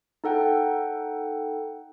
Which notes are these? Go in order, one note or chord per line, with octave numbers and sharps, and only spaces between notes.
D#4 A4 F#5 G5